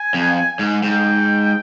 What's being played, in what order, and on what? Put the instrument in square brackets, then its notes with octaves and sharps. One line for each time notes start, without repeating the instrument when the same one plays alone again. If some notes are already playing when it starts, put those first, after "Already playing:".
Already playing: [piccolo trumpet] G#5
[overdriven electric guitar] F2
G#2
[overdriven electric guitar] G#2 [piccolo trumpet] G5